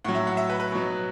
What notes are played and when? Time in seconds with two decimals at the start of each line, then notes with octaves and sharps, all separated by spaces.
0.04 A2 F#3 F#5
0.15 E5
0.27 F#5
0.37 E5
0.50 B4
0.60 B4
0.72 B2 F#3